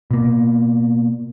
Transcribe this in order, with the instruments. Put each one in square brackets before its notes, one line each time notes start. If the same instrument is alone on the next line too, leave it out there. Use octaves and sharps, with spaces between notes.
[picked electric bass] B2 A#3